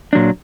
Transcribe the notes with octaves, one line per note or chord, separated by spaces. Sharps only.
A#2 F#3 D4